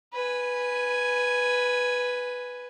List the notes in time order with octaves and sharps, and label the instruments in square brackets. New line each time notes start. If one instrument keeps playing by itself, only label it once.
[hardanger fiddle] B4 G#5